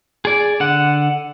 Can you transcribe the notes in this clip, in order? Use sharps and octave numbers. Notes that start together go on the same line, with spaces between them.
G#4 D5
D3 F#5